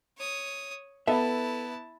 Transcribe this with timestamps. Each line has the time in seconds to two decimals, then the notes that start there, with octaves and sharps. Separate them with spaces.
0.17 C#5 D#6
1.08 B3 E4 A4 E5 A5